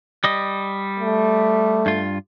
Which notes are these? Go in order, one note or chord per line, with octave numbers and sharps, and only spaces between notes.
G3 D#5
A3
G2 F4